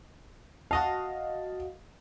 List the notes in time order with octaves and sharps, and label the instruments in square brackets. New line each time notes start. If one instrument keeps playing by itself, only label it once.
[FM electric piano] F#4 D#5 F5 [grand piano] A5